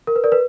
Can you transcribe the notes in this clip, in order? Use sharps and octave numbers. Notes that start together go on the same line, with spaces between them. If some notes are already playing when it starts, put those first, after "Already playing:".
A#4
B4
A#4 D5
B4